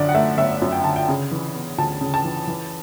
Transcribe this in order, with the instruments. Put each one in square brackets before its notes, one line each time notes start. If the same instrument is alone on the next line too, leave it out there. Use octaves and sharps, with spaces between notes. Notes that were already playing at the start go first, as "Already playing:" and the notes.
Already playing: [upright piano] F#2 D3 D5
F#5
A3 E5
G1 E5
F#2
G5
D3 A5
G5
C#3
E3
B3
D2 A5
C#3
A5
E3
E3